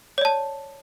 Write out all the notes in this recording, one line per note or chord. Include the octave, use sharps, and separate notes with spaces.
C#5 D5 A5